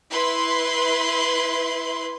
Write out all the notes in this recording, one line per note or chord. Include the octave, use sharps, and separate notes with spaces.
E4 B4 C6